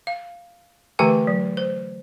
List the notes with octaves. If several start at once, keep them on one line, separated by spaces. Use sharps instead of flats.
F5
D3 E3 A3 G4 G5 G#5
F#3
C5